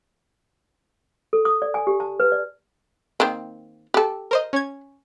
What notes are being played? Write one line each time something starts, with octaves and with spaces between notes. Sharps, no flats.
A4
D#6
D5
G#5
G4
A5
B4
D5
D#3 A#3 C4
G4 A4
A#4 C5 D#5
C#4 G#6